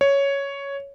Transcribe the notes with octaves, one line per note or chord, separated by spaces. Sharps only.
C#5